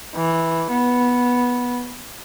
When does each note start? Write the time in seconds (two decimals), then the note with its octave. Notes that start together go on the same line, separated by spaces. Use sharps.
0.14 E3
0.71 B3